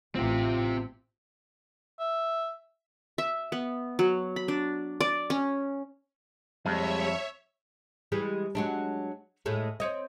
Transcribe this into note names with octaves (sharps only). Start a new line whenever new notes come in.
A1 C4 F4 G4
E5
E5
B3
F#3
B5
D4
D5
C#4
F2 G3 G#3 C#5 E5
E3 G3 G#3
F#3 G#3 D4
A2 G#3 A3
C4 C#5 D#5